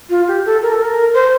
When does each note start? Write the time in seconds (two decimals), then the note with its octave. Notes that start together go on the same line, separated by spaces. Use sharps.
0.10 F4
0.28 G4
0.45 A4
0.62 A#4
0.72 A4
0.82 A#4
1.14 C5